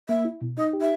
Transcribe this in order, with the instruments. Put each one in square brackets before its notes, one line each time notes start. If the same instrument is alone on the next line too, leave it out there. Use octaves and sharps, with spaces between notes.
[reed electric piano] A#3 [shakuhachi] E5
[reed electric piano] E4
B2
[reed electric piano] D#4 [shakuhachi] D#5
[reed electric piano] G4
[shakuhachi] E5